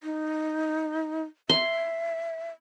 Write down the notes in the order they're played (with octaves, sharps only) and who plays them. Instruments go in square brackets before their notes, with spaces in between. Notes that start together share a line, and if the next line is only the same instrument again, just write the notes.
[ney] D#4
[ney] E5 [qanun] C6